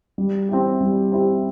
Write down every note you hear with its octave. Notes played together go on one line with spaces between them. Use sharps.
G3
C4 E4 G4
G3
C4 E4 G4